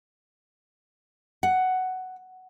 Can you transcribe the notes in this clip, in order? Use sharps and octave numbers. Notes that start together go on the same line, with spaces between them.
F#5